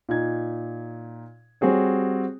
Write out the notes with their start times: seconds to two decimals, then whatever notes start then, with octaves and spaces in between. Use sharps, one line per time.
0.09 A#2 D#4 G#6
1.61 G3 C4 F#4 G#4 C#5